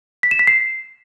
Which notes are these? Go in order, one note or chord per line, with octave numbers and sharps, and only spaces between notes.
B6
E7
B6
C7